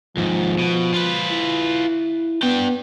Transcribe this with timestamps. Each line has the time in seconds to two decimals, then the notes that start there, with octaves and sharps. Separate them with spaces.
0.17 D#2 G#2 F3
0.59 B2
0.94 F4 B4
1.31 E4
2.43 B3 D4 G5